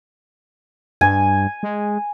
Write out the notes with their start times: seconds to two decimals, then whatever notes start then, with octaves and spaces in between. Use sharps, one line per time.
1.01 G2 G#5
1.63 G#3